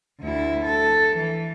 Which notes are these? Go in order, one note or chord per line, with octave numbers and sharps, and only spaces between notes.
D2 E4
A4
E3